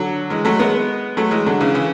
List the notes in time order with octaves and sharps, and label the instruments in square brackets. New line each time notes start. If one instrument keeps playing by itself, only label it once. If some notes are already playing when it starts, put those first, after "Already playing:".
Already playing: [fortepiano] D3 F#3
E3 G#3
F#3 A3
G#3 B3
F#3 A3
E3 G#3
D3 F#3
C#3 E3
C#3 E3